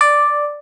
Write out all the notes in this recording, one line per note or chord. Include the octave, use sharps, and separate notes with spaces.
D5